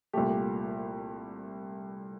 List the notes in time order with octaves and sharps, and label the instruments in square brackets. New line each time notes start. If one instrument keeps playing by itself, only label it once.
[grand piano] C2 A#2 A3 G4